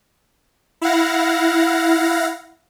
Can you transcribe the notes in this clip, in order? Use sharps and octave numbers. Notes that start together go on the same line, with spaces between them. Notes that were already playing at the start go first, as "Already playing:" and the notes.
E4 F5 F#5 A#6